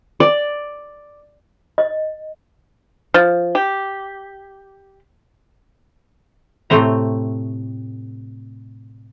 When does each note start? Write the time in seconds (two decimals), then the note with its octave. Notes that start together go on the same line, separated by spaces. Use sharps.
0.20 D5
1.78 D#5
3.14 F3
3.55 G4
6.70 A2 C3 A3 C4 A#5